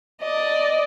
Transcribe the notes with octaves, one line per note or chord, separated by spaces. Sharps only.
D5 D#5